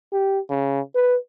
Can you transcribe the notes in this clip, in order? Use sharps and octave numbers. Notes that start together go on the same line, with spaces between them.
G4
C#3
B4